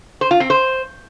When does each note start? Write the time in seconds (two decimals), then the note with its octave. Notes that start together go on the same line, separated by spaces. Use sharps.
0.21 C5
0.31 F4
0.40 C4
0.50 C5